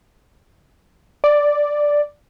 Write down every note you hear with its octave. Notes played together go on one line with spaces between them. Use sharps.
D5